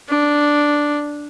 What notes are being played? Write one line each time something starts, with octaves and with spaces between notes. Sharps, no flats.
D4